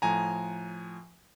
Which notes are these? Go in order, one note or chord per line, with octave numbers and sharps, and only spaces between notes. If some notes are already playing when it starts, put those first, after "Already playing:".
A2 F3 G#5 A#5